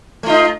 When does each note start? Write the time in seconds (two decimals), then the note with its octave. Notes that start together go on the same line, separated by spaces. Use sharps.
0.23 A3
0.26 F4
0.30 D#4